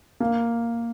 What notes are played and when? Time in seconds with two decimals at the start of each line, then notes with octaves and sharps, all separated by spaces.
0.20 A#3